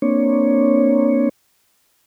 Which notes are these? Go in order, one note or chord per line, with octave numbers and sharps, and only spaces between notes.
A#3 C4 D4 C#5